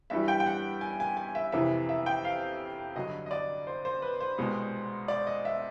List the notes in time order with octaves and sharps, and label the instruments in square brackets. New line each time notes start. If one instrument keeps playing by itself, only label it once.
[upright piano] G2 E3 G3 E5
G5
G5
F#5
G#5
G#5
G#5
E5
F2 C3 E3 E5
E5
G5
F5
G2 D3 F#3 D#5
D#5
D5
C5
C5
B4
C5
C2 B2 G#3
D5
D#5
E5